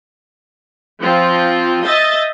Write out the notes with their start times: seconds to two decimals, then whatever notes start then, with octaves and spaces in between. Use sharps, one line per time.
1.00 F3 C4 F4
1.85 D#5 E5 D#6 G6 A6